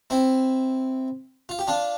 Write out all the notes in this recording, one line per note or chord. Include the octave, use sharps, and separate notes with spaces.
C4 E4
F4
G4
D4 F4